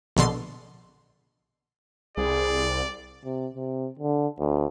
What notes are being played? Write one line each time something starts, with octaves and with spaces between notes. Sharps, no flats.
A#1 B2 D3 C6 A6
C2 G#4 D5
C3
C3
D3
D2